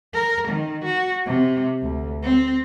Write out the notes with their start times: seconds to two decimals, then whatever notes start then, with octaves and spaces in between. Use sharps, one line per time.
0.14 A#4
0.48 D#3
0.85 F#4
1.26 C3
1.82 D2
2.23 C4